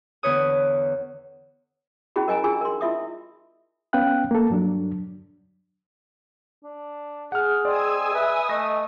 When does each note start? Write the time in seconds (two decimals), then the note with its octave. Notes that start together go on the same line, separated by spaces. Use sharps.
0.23 E2 D3 B4 C#5 D#6
2.16 C#4 E4 F#4 G#4 B5
2.28 A#4 D#5 G#5 A#5
2.44 D4 F4 G#4 G#5 E6
2.61 A#4 C6
2.81 E4 F4 E5 D#6
3.93 B3 C#4 F5 G5 F#6
4.31 A#3 A4
4.50 G2 F#3 D4
6.63 D4
7.32 G#4 F#5 F6
7.65 C4 D5 D#5 G#5 D#6 E6
8.14 B4 E5
8.49 A3 D#5 A#6